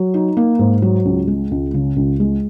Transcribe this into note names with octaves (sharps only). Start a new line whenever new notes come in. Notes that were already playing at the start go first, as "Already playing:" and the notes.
Already playing: F#3
D#4
A#3
G#2
F#3
C#2
G#3
C#2
C#3
C#2
G#3